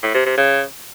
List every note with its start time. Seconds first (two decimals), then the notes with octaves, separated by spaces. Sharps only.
0.03 A2
0.14 C3
0.26 C3
0.37 C#3